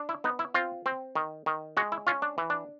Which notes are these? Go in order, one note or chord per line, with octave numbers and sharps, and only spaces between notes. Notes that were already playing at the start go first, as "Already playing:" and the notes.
Already playing: D4
E4
B3 D#4
E4
C4 F4
C4
D#3
D#3
G#3 F#4
E4
C#4 F4
D4
E3
D4